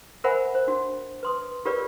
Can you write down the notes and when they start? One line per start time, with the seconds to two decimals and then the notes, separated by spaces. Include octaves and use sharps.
0.24 A#4 C5 E5 F#5 G#5 B5
0.55 C5
0.67 D4 F#4
1.23 B4 C6 D#6
1.65 F4 G4 A#4 B4 C#5 D5